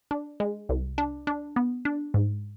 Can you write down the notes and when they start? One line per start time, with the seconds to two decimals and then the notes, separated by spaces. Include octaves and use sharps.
0.11 D4
0.40 G#3
0.69 C2
0.98 D4
1.27 D4
1.56 B3
1.85 D4
2.14 G#2